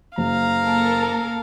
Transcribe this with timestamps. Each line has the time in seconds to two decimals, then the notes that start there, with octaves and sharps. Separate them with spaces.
0.18 F#1 F5 A#5
0.61 A#3 A4 A#4